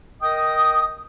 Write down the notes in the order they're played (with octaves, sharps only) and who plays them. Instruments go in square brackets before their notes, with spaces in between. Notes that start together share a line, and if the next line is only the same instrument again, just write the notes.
[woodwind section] A#4 D#5 G5 D#6